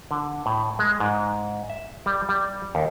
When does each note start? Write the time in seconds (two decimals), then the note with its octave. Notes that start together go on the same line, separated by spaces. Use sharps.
0.11 D3
0.46 A2
0.79 G#3
1.00 G#2
1.70 E5
2.06 G3
2.29 G3
2.75 D#2